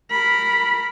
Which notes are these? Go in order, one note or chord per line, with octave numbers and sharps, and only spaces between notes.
A#4 B5